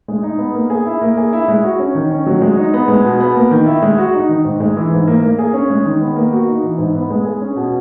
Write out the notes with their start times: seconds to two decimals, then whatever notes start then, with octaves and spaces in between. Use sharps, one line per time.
0.08 G#3
0.23 D#4
0.38 B3
0.54 A#3
0.70 G#4
0.86 E4
1.01 A#3
1.17 G#4
1.33 E4
1.48 G#3
1.64 F#4
1.79 C#4
1.95 D#3
2.11 C#4
2.26 F#3
2.42 G#3
2.57 D#4
2.74 B3
2.88 G#3
3.04 B2
3.20 B3
3.36 A#3
3.51 D#3
3.66 E4
3.82 G#3
3.98 F#4
4.14 D#4
4.29 D#3
4.45 G#2
4.60 G#3
4.77 E3
4.92 G#2
5.07 A#3
5.23 A#3
5.39 G#4
5.54 C#4
5.70 G#3
5.86 D#3
6.01 B3
6.16 A#3
6.32 F#4
6.47 D#4
6.63 E3
6.78 G#2
6.95 B3
7.10 G#3
7.25 G#4
7.41 C#4
7.56 B2